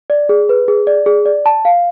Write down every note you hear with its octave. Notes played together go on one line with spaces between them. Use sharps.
D5
G#4
B4
G#4
D5
G#4
D5
A5
F5